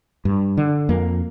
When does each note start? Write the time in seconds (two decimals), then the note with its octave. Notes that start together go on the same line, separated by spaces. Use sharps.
0.25 G2
0.57 D3
0.89 F2 A#3